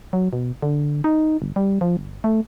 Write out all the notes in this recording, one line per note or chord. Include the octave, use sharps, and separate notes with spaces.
F#3
B2
D3
D#4
G1
G3
F3
G1
A3